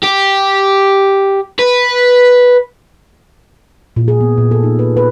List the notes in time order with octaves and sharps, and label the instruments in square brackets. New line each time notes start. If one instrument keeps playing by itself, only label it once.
[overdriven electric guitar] G4
B4
[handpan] A#2
G#4
B3
A#2
A4
D#4
B4
B4